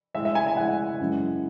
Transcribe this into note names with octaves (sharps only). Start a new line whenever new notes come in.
A2 G#3 E5
E5
G#5
G#5
A2 G#3 F#5
F#2 E3 G#3